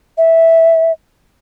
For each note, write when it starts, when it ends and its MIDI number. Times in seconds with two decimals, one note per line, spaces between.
0.17 0.92 76